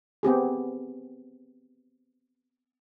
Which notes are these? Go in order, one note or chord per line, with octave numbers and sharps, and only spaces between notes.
B3 C4 G4 G#4